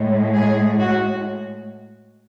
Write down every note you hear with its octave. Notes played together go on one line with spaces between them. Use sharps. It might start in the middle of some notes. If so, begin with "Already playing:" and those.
Already playing: A2 G#3
G#4
F#4